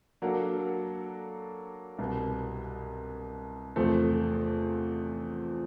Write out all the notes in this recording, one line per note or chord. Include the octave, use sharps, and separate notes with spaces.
F#3 A#3 D4 F#4 A4
C2 B2 G3
E2 C3 F3 A3 C4